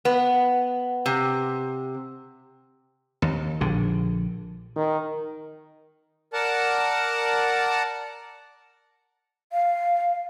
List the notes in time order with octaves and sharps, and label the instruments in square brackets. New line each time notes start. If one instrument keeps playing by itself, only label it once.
[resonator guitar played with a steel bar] B3
C3
[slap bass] D#2
A#1 D3
[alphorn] D#3
[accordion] A#4 D5 F#5 A5
[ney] F5